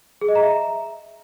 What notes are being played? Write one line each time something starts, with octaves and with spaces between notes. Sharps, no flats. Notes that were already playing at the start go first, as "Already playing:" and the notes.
G#4
D#5
A#5
E5